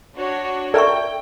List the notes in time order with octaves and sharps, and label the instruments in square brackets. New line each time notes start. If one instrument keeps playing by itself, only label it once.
[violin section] D4 F#4 C#5
[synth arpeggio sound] A4 A#4 E6 [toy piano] D5 E5 C#6 [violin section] G5